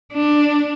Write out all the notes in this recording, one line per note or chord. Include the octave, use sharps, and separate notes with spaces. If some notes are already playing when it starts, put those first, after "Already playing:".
D4